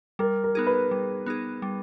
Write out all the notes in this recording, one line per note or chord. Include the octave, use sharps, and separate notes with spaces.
G3 A#4
A#4
B3 D#4 G#4
B4
G3
B3 D#4 G#4
G3